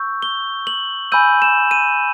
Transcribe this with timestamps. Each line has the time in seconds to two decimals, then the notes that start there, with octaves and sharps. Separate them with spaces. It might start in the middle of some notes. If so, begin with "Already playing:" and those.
Already playing: C#6 E6 G6
0.22 G7
0.67 F#7
1.12 G#5 B5 E6 G6 D#7
1.42 E7
1.71 D#7